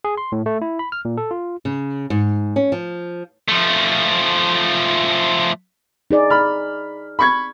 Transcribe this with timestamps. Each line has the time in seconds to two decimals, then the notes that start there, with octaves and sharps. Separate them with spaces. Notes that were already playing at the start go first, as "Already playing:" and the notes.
0.05 G#4
0.17 C6
0.32 A2
0.46 A3
0.62 E4
0.79 B5
0.92 F6
1.05 A#2
1.17 A4
1.31 F4
1.65 C#3
2.10 G#2
2.56 C#4
2.72 F3
3.48 F3 A3
6.11 D#4 G#4 D5
6.30 B5 F6
7.19 B5 C#6 G#6